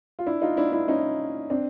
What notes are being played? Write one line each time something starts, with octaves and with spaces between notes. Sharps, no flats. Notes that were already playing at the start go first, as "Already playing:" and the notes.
F4
D4 E4
D#4 F4
D4 E4
D4 E4
C#4 D#4
C4 D4